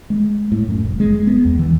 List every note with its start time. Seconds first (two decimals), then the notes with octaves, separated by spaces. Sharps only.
0.10 G#3
0.52 A2
0.68 F#2
0.84 F1
1.00 G#3
1.27 B3
1.45 E2
1.59 E3